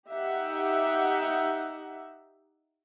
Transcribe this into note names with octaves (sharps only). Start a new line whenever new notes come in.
D#4 G4 E5 F#5